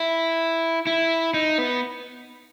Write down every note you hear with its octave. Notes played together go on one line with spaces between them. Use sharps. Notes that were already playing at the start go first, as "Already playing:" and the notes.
Already playing: E4
E4
D#4
B3